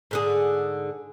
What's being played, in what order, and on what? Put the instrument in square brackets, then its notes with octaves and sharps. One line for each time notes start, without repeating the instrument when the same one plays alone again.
[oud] G#2 D3 G#4